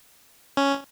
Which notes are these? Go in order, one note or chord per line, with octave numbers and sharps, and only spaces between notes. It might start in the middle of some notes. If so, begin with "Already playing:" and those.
C#4